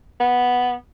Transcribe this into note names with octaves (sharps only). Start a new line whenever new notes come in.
B3